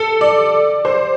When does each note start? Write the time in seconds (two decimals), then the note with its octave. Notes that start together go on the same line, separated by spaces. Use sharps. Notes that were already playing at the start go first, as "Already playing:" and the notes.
Already playing: A4
0.21 D5
0.85 C5